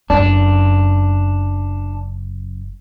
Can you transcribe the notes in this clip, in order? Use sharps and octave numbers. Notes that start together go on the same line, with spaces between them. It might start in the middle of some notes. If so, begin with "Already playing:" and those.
F#1 F#2 D4